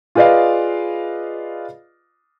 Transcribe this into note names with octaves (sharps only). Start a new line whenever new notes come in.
F4 G#4 B4 D5 D#5 F5